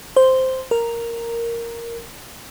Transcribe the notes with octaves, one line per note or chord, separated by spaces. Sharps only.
C5
A#4